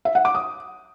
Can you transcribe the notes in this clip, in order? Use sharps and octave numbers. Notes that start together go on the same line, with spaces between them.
E5
F#5
D6
D#6